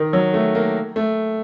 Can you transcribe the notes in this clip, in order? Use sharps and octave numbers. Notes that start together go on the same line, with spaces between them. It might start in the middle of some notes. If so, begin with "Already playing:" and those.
Already playing: D#3
F#3
A3
A#3
A3